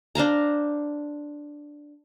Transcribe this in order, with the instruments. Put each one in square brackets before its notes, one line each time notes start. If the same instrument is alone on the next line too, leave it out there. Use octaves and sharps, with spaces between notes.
[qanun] D4 C5 F5 A#5